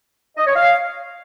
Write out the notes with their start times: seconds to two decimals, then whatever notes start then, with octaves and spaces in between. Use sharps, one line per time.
0.37 D#5
0.46 C#5
0.56 F5